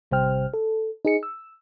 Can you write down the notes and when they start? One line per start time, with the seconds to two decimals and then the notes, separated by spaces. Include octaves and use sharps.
0.11 A1 C3 G3 C5 G5 F6
0.53 A4
1.05 D#4 G#4 C#7
1.23 E6